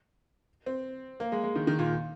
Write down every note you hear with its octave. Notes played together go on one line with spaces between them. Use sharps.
C4
A#3
G#3
G#3
D#3
D#3
A#2